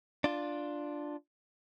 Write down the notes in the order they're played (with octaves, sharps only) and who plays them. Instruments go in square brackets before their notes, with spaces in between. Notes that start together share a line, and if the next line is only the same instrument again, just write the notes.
[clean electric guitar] D4 F4